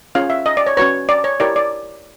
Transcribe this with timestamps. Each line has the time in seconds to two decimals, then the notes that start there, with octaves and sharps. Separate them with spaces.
0.15 C#4 F4 G#4 C#5 F5
0.30 E5
0.46 D#5
0.57 D5
0.67 C#5
0.77 C#4 F#4 B4 C#5
1.09 D5
1.24 C#5
1.40 E4 G4 A#4 C#5 D5
1.56 D5